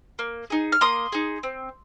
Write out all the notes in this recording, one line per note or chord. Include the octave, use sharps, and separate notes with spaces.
A#3
D#4 G#4
F6
A#3 C6 D#6
D#4 G#4
C4